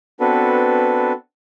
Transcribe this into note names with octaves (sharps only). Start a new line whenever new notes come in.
B3 C4 D4 F#4 A4 B4